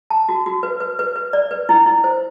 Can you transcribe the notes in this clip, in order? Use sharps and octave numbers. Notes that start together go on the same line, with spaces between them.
A5
F#4
F#4
B4
B4
B4
B4
D5
B4
E4
E4
C5